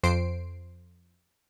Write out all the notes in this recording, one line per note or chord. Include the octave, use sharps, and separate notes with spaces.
F2 C5 C7 D7